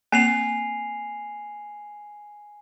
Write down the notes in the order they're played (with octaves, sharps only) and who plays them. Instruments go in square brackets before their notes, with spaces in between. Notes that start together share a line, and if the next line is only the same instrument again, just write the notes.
[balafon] A#3 C4 [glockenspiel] G#5 C7 F7